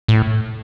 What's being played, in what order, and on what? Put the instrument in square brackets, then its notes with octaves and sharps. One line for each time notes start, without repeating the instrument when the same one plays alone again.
[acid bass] A2